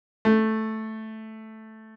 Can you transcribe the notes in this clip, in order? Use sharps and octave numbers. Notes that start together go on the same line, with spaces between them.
A3